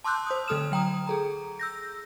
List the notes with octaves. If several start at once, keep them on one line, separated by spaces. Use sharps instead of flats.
A5 C6 D6 E6 F#6 G6
C5 D#6
D3 A3 A4 D#6 F6 E7
F#3 G5 A#5 D#6
G#4 A4 A#5
E6 G6 A#6